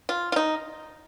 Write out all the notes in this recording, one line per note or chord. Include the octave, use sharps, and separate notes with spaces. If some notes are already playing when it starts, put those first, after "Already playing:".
F4
F4
D#4